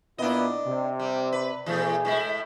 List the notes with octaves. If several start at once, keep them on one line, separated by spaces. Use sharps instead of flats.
A#2 B3 D4 E4 D#5
C3
G3
B4
B2 E3 A3 G#4
A2 G#3 E4